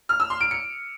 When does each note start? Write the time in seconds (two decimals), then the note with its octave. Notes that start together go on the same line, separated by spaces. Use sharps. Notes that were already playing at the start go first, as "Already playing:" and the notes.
0.09 F6
0.20 E6
0.30 C6
0.41 D7
0.51 C#7